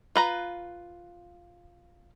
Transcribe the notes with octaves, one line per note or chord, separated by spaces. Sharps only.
F4 B4 A#5